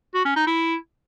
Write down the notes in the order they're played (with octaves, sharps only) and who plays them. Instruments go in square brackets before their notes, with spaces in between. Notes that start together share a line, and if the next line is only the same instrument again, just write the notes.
[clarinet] F#4
C#4
D#4
E4